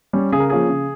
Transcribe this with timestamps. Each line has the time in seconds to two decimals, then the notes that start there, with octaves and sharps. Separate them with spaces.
0.13 G3 C#4
0.32 C#3 G#4
0.40 A#4
0.50 F3 A#3 C#4 G#4
0.69 C#3